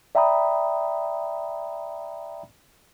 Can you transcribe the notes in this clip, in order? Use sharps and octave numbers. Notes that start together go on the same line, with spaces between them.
D5 E5 G5 A#5 B5 D#6